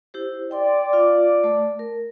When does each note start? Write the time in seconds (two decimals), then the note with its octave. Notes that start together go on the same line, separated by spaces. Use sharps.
0.14 E4 G4 C5
0.51 D5 G5 C6
0.93 F4 F5 D6
1.44 A3 A5
1.79 A#4